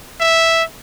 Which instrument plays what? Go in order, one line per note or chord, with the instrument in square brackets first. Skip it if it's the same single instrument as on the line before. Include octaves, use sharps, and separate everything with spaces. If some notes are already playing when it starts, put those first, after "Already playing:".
[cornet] E5